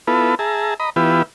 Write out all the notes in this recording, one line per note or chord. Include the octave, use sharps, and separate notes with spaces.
B3 E4 F4 A4 B4
G#4 E5 A5 A#5
D#5 A#5 B5
E3 B3 E4 F4 G4 B4